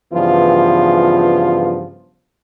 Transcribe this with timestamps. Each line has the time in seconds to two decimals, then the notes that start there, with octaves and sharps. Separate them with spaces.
0.13 G2 C#3 E3 F3 B3 F4